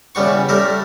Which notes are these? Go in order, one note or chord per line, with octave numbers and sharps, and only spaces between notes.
E2 C#3 G3 B3 C#6
G3 A3 E4 A#4 E5